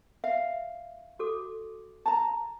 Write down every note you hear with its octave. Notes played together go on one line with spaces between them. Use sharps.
E5 F5
F#4 A4 D6
A5 A#5